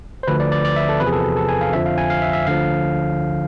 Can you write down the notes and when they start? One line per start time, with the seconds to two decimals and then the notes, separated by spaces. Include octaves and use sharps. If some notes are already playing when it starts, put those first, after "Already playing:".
0.23 C5
0.27 D2 D3 F3 B4
0.40 D5
0.52 D5
0.65 D5
0.76 E5
0.89 A4
1.00 E2 C3 F3 B4
1.07 G#4
1.13 A4
1.37 A4
1.48 G#5
1.61 F5
1.73 F2 D3 F3 E5
1.86 F5
1.98 G#5
2.10 F5
2.22 E5
2.33 E5
2.47 D2 D3 F3 F5